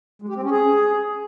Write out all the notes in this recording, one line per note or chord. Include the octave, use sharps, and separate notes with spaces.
G#3
G4
C4
C#4
G#4